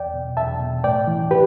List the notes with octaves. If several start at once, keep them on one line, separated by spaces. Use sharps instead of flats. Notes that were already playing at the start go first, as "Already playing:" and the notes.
Already playing: E2 D5 G5
B2
E2 E5 A5
B2
A2 D5 G5
E3
G4 B4